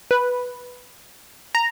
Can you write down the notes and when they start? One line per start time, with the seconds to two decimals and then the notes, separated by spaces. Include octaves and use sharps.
0.11 B4
1.55 A#5